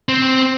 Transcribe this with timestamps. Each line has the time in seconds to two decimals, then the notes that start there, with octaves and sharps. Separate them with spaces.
0.09 C4